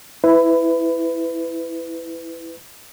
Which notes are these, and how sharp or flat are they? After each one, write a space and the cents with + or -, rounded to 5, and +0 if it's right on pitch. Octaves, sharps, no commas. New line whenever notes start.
E4 +0 B4 +25